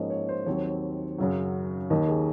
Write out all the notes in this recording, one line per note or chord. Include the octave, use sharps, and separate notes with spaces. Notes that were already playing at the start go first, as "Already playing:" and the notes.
Already playing: G#2 F3 A#3 C#4 C#5 D#5
C#5
C5
D#2 D#3 F#3 C4 C#5
F#2 C#3 F#3
D#2 D#3 A#3 D#5
G#4